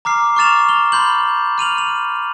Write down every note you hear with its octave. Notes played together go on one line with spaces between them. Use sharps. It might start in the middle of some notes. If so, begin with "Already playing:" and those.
A#5 D6 F6 C7
C#6 D6 F6 A6 E7 F7
F7 G7
B5 C6 G6 F#7
F6 D#7 F7 F#7
F7